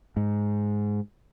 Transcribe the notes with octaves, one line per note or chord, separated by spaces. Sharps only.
G#2